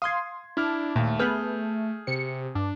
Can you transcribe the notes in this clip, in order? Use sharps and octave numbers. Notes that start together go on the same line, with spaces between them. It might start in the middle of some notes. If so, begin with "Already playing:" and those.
F5 C6 D#6 G#6
D4 E4 F6
D#2 A#2 A3
B3 G#4 B4 F6 G6
C3 C#7
G2 D4